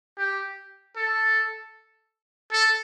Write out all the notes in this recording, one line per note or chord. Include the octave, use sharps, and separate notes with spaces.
G4
A4
A4